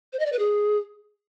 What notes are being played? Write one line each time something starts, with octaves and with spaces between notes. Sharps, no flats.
C5
D#5
D5
B4
G#4